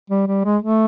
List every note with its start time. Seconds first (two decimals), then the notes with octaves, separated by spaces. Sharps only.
0.10 G3
0.27 G3
0.45 G#3
0.62 A3